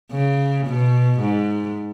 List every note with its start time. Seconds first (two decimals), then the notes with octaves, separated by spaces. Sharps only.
0.12 C#3
0.67 B2
1.20 G#2